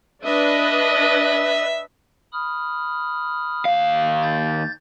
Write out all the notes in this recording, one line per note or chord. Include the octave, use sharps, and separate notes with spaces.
D4 B4 D#5 E5
B5 D#6 F6
D#2 F5
G6 A6